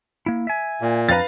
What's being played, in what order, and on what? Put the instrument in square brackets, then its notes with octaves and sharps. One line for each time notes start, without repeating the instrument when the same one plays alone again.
[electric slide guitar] A#3 E4
E5 G#5
[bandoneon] A#2
[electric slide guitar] F2 A#5 [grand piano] B4 F5 A6